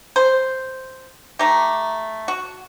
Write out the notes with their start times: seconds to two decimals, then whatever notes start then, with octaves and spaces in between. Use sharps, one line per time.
0.16 C5
1.39 A3 D#4 G4
2.28 F#4